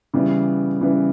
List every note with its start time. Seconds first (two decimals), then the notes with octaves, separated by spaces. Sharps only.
0.14 C#3 E3 G3 B3
0.81 C#3 E3 G3 B3